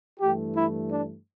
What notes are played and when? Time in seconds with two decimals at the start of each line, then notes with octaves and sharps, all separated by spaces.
0.20 G2 E3 A3 G4
0.54 E4
0.89 D4